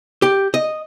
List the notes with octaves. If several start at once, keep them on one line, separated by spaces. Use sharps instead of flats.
G4
D#5